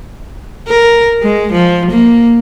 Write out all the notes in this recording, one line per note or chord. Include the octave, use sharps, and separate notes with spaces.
A#4
G#3
F3
A#3